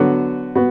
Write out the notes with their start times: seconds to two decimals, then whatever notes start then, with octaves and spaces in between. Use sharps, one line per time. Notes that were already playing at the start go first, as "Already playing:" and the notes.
Already playing: D3 F#3 B3 F#4
0.55 B3 F#4